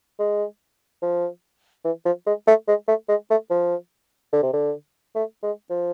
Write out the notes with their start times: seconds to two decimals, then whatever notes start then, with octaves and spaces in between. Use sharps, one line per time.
0.19 G#3
1.02 F3
1.85 E3
2.05 F3
2.27 G#3
2.47 A3
2.68 G#3
2.88 A3
3.09 G#3
3.30 A3
3.50 F3
4.33 D3
4.43 C3
4.53 D3
5.15 A3
5.43 G#3
5.70 F3